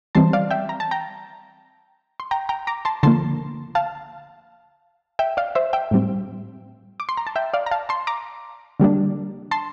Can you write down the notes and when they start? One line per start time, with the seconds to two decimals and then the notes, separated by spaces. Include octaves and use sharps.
0.15 E3 G3 C4 A5 C6
0.33 D5 F5
0.51 E5 G5
0.69 A#5
0.80 A5
0.91 G5 A#5
2.20 C6
2.31 G5 A#5
2.49 G5 A#5
2.67 A#5 D6
2.85 A5 C6
3.03 D3 F3 A#3 A5 C6
3.75 F5 A5
5.19 E5 G5
5.37 D5 F5
5.55 C5 E5
5.73 E5 G5
5.91 A2 G3 C4
7.00 D6
7.09 C6
7.17 A#5
7.27 A5
7.36 E5 G5
7.54 D5 F5
7.66 A#5
7.71 F5 A5
7.89 A5 C6
8.07 A#5 D6
8.80 D3 G3 A#3 D4
9.51 A5 C6